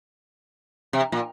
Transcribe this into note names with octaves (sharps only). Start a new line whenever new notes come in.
C3
A#2